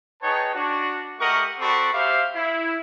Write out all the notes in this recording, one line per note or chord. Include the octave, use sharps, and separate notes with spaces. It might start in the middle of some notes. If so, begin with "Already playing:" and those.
D#4 G#4 B4 C#5 G5 A5
D4 F#4
A3 G4 A#4 D#5 F#5 C#6
C4 F#4 A4 D5 B5 C#6
G4 C5 E5 F5
E4